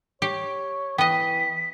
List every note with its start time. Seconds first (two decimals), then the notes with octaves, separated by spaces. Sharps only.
0.22 G4 C#5
0.98 E3 B3 D#5 G5 B6